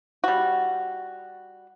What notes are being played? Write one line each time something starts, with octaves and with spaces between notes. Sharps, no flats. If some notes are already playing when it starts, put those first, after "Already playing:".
G3 F#4